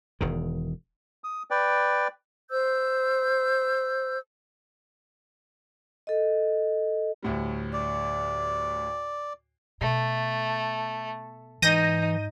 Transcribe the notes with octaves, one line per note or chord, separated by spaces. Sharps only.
E1 E2 D#3
D#6
B4 D5 G5
C5 E6 G6
A4 D#5
D2 A2 G3
D5
B2 A3
G#2 E3 D#4 G6 A#6 D#7